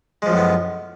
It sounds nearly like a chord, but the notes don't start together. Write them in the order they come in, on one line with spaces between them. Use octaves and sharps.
G#3 F3 F#2 A2 B3